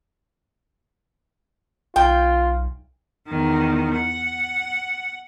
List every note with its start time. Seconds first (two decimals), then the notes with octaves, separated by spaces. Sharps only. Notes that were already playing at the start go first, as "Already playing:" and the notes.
1.96 B1 F4 G5
3.27 E2 D#3
3.95 F#5